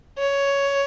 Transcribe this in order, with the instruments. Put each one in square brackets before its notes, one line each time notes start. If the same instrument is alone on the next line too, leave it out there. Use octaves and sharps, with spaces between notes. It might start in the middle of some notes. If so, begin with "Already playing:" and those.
[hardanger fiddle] C#5